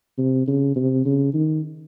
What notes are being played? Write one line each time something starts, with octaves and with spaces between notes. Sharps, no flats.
C3
C#3
C3
C#3
D#3